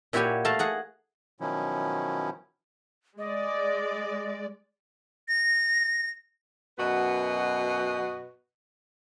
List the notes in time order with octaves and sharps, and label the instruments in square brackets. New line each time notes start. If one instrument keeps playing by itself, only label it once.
[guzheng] A#2 E4 F#4 G4 C#5 G#5
A3 A4 F5 A5 A#5
G#4 F#5 A#5
[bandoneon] B2 D#3 F3 F#3 C#4 E4
[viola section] G#3 D5 [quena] D#5
[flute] A#6
[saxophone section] F#2 B2 F#4 B4 D#5